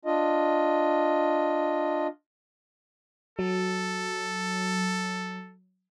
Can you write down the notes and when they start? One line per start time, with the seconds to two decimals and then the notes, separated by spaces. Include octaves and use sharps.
0.05 D4 F4 D#5
3.39 F#3 A4